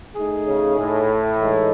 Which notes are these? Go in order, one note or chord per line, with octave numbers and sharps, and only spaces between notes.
A3 D#4 G#4
C#3
A2
E3 G#3 D#4 A4 D#5